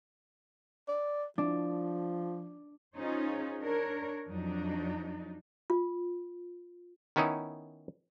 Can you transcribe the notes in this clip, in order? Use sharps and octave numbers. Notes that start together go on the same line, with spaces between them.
D5
F3 D4
C#4 D#4 F4 G#4 C5 C#5
D4 A#4 C#5
F2 F#3 D4 D#4
F4
D#3 B3 C#4 D#4 E4